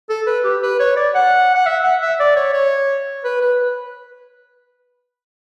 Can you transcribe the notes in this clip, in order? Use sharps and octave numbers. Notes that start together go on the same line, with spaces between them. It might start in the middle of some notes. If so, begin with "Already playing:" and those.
A4
B4
G4
B4
C#5
D5
F#5
F#5
E5
F#5
E5
D5
C#5
C#5
B4
B4